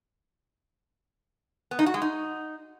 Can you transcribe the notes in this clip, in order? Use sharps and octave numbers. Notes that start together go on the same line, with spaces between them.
B3
D#4
F#4
G#3
D#4